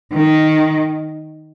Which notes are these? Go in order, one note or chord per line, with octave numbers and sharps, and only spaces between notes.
D#3